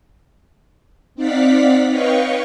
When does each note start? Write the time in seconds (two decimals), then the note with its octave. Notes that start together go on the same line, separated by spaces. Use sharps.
1.15 C4 D#4 D5 F5 F#5 B6
1.90 B4 C#5 D#5 F5 G5 C#6